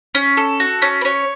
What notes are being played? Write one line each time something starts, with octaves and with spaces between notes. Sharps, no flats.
C#4
A4
F#4
C#4
B4
C#4 C#5